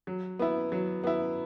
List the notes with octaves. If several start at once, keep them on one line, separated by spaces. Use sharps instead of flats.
F#3
B3 E4
F#3
B3 E4